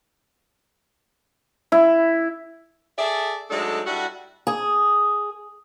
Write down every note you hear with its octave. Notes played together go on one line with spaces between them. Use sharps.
E4
G#4 A4 D5 E5
F#3 G#3 A3 D4 D#4 A4
G3 D4 E4 F#4
G#4